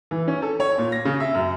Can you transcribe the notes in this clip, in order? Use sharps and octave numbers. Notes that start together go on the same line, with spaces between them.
E3
C#4
A4
C#5
A#2
A#6
C#3
E5
F#2